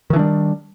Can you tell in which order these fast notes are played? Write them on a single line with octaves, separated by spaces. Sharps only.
D#3 E3 D4 G3